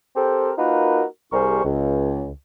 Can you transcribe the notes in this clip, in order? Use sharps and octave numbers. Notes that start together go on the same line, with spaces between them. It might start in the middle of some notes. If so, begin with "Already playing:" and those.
C4 G4 A4 A#4 C5
A#3 D#4 F4 F#4 A#4 B4
C2 G3 G#4 A#4 C5 C#6
C#2